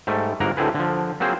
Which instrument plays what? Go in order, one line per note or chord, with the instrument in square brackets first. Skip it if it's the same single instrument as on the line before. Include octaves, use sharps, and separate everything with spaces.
[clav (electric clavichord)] G#2 G3 A3
G1 G#2 A#3 A#4 F#5 A#5
D2 A2 D3 C4 G#4 B4
D3 F3
F#3 A#3 C4 G#4 C5